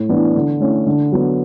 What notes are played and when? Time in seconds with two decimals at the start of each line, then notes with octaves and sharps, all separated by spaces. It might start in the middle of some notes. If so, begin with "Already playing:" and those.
Already playing: A2
0.09 E3 B3 D4
0.35 D3
0.60 A3 C#4 E4
0.86 D3
1.12 F#3 B3